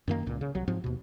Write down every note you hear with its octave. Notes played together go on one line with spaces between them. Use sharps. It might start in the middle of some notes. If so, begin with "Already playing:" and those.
F#2 D#3 A#3
C#2 A#2
C#3
C2 F#3
G#2 F3 C4
D#2 B2